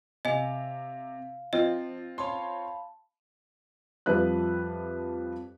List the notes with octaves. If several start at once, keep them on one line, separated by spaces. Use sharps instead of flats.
C3 D#5 F5 G#5
F3 C4 F4 D#5
C#5 F5 A5 B5 C6
F2 F3 G3 B4 E5 F#6